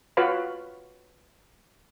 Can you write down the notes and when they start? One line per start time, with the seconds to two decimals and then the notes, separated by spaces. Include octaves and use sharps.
0.17 F4 F#4 B4 C#5 F5 B5